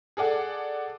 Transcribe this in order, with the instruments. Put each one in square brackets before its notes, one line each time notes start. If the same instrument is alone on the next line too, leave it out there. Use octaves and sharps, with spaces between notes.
[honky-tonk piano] G#4 A4 D5 F#5